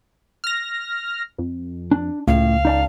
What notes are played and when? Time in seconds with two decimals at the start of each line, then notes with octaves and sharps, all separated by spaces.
0.44 F6 A#6
1.38 F2
1.91 D4
2.28 C#2 A2 F5
2.65 D#4 D5 A5